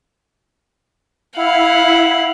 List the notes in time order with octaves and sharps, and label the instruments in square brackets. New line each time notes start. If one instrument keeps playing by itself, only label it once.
[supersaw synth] E4 [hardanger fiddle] F5 F#5